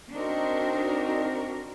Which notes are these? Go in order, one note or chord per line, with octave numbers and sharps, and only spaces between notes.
C4 D4 D#4 F#4 A#4